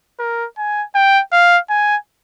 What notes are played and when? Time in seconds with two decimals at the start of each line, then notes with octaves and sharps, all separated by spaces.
0.20 A#4
0.58 G#5
0.95 G5
1.32 F5
1.70 G#5